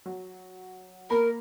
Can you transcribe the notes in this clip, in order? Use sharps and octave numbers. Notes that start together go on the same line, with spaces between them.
F#3
A#3 A#4 A#5 B5